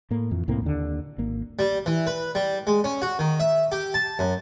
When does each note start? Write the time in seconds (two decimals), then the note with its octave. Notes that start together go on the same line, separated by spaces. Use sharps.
0.11 A2 A#3
0.31 F2 E3
0.48 C2 A2 A#3 C4
0.62 D#2 D3
1.18 G#1 A#3
1.59 G3
1.86 E3
2.07 B4
2.35 G3
2.67 G#3
2.84 C#4
3.02 F#4
3.19 D#3
3.40 E5
3.72 G4
3.94 A5
4.19 F#2